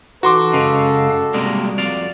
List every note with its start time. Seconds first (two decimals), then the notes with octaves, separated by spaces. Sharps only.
0.23 E3 D#4 F#4 A4 C6 D6
0.54 F#2 C#3 G#3 F5
1.34 C3 G3 G#3 A#3
1.78 F2 D5 F5